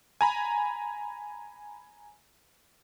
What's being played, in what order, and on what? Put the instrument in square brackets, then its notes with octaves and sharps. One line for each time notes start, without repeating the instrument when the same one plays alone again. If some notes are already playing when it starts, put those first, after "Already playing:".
[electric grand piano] G#5 A#5 B5